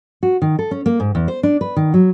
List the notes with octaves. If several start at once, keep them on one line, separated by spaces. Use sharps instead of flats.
F#4
D#3
A4
C#4
A#3
G#2
E2
C5
D4
B4
D#3
F#3